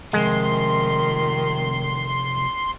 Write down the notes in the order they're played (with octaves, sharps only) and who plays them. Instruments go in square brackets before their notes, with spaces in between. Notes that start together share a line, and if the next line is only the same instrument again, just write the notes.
[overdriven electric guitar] C3 F3 [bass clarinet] D#3 [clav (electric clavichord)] G#3 [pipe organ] C6